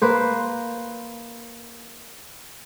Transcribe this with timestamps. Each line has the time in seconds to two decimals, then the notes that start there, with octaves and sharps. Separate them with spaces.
0.02 A#3 B4 C5